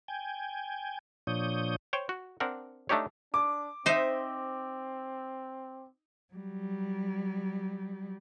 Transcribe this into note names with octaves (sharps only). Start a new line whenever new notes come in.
G5 G#5
A#2 F3 D4 C#5 D#6 G6
C5 C#5 G5
F#4
C4 D4 A#4 F#5
A3 D4 D#4 G4 C#5
D4 D6
C4 D#4 C5 D#5 E5
F#3 G3